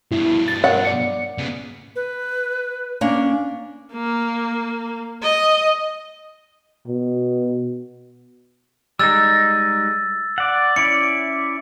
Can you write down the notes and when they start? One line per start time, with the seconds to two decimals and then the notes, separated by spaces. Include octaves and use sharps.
0.11 G2 B2 E4
0.48 A6
0.64 A#4 C#5 F#5
0.85 D5 C#7
1.38 C#3 B3
1.96 B4
3.01 A#3 C#4 D4
3.93 A#3
5.23 D#5
6.87 B2
8.99 G3 G#3 D#4 E6 A6
10.38 D5 F#5
10.76 C#4 E4 D5 C#7